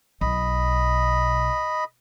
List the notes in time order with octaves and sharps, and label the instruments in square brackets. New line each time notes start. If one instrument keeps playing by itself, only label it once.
[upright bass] B1 [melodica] D#5 B5